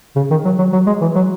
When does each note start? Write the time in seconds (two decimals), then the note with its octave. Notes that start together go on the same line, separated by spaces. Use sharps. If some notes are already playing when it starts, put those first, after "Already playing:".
0.16 C#3
0.31 D#3
0.45 F#3
0.58 F#3
0.73 F#3
0.87 G#3
1.01 E3
1.15 F#3